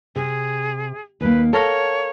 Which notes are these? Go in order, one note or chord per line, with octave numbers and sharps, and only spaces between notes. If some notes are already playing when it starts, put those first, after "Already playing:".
C3 G#4
D#2 A#3 B4
A4 A#4 C#5 F5 F#5